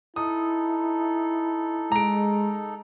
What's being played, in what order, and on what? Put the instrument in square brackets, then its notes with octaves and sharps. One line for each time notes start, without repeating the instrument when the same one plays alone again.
[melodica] D#4 A4 [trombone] E4 [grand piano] D#6
[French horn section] G#3 [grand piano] A#5 D7